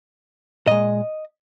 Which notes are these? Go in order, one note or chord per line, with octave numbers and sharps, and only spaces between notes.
A#2 G#3 D#5